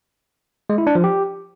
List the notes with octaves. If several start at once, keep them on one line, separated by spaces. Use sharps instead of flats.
G#3
E4
D4
F3
G4